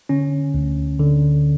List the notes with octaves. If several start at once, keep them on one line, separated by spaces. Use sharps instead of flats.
D3 C#4
D2
D3